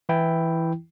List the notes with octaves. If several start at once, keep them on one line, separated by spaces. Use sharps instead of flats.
E3 E4 G5